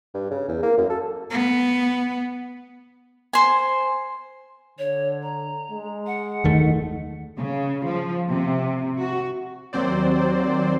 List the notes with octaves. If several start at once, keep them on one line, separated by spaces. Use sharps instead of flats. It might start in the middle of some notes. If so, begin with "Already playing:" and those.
G2
C#3
E2
A#3
F#2
A4
B3
C5 G#5
D3 C#5
A#5
G#3
F#5
F#1 D#2 D#3 A3
C#3
F3
C3
F#4
D#2 F#3 C4 C5 D5